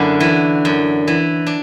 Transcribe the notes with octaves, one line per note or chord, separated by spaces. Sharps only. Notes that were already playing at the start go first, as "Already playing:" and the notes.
Already playing: F#2 D3 D4 E4 F#4
E3
F#2
E3
D4